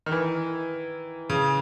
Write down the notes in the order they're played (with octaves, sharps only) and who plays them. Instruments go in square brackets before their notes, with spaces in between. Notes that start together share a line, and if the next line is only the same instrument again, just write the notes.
[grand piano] D#3
E3
C#3